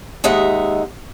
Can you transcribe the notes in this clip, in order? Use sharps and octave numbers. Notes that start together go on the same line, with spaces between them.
D#2 G#3 D#4 E5 F#5